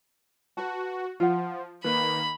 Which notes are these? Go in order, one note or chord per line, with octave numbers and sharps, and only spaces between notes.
F#4 B4 A5
F3 F4 F#5
D#3 A#3 B4 B5